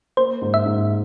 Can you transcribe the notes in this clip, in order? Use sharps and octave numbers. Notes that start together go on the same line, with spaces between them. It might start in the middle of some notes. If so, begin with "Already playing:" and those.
A#3 C5
G#2
E5
G#2